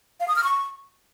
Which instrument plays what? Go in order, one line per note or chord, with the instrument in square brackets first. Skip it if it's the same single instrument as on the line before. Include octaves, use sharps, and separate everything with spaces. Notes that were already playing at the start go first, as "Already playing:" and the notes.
[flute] F5
D#6
F6
C#6